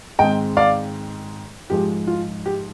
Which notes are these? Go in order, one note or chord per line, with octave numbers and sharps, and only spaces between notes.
G#2 D#3 G#3 C4 D#5 G5
D5 F5
G#2 F3 G#3 G4
F4
G4